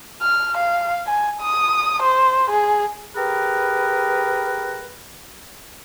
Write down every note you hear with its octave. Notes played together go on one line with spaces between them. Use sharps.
F6
F5
G#5
D#6
C5
G#4
G4 G#4 A#4 B4